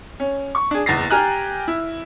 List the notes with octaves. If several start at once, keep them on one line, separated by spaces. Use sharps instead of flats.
C#4
C#6
D4 G#4
F#1 E2 A6 A#6 C7
G4 G5 G#5 A#5 F6 F#6
E4